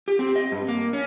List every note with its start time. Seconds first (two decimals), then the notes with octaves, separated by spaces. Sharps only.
0.08 G4
0.19 C4
0.36 D#5
0.52 G2
0.68 A#3
0.93 C#4